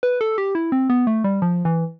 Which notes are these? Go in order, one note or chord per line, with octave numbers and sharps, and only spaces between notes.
B4
A4
G4
E4
C4
B3
A3
G3
F3
E3